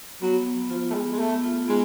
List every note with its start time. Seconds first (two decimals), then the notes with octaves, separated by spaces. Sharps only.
0.22 F#3 B3
0.46 B3
0.70 F3 F4
0.90 A3
0.94 G#3 B3
1.12 G#3
1.19 A3 B3
1.44 F4
1.68 G#3 B3